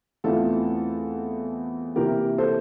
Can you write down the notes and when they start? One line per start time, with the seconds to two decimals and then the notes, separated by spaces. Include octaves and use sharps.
0.24 E2 E3 A3 C4 F4 A4
1.96 C3 E3 A#3 E4 G4 A#4
2.38 A4 C5